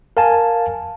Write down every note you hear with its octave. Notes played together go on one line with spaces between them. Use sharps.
A#4 F5 G#5 A5